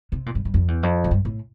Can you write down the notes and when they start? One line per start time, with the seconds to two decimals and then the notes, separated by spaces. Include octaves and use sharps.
0.12 C3
0.26 A#2
0.35 G2
0.45 G2
0.54 F2
0.68 E2
0.83 F2
1.04 A2
1.11 G2
1.25 A2